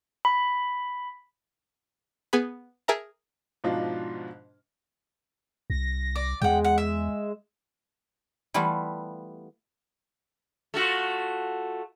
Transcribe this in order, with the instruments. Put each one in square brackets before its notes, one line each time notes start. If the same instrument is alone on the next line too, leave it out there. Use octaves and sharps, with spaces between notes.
[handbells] B5
[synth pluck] B3 G#4 B5
G#4 A#4 E5 A5 A#5
[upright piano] G#2 B2 F3 D4 D#4 F4
[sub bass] C2 [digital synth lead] A#6
[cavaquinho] D5
[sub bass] E2 [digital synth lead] G#3 [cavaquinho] F#5 G5
[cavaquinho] F#5
E5
[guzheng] E3 G3 A3 B3 E4 F4
[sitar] A3 F4 F#4